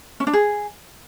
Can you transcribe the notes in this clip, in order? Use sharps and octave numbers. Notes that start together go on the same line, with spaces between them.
C#4
D4
G#4